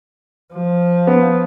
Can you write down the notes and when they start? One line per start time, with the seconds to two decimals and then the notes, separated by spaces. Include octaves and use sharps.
0.54 F3
1.07 B3